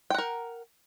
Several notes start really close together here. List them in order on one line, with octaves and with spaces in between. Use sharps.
G5 F#5 A#4